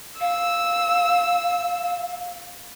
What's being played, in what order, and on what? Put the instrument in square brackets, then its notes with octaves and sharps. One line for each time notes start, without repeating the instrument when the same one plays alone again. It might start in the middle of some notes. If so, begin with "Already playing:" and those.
[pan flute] F5 [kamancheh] E6